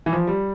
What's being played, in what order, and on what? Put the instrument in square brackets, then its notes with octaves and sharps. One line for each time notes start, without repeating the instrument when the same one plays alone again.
[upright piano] E3
F3
G3